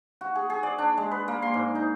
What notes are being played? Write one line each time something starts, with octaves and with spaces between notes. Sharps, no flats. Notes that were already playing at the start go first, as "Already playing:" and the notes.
F#4
G#4
G#4
D5
D4
G#3
B4
A#3
C6
G#2
D#4